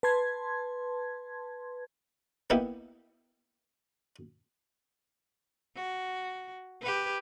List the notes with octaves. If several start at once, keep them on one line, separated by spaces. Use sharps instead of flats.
B4 A5 C6 G#6
A#3 B3 D#4 E4 G4
F#4
G4 B4